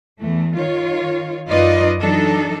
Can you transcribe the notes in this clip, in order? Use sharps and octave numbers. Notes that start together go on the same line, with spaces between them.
E2 E3 A3
D#3 F4 C#5
F#2 D#4 F4 B4 D5 D#5
E3 F#3 D4 D#4 A4